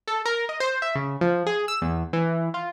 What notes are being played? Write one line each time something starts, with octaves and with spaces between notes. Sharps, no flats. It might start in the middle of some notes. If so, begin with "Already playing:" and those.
A4
A#4
D#5
C5
E5
C#3
F3
G#4
E6
E2
E3
F4